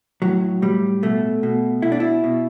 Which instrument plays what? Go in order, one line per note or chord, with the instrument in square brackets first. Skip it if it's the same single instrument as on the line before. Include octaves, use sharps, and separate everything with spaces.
[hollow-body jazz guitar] A2 F#3
A2 G3
B2 A3
B2
B2 E4
D4
E4
B2